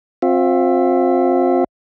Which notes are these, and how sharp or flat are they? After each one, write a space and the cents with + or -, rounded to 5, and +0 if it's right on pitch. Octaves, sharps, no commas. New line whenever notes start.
C4 +15 F4 +35 E5 +10